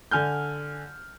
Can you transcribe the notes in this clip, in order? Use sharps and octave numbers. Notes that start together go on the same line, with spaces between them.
D3 G#5 F6 G6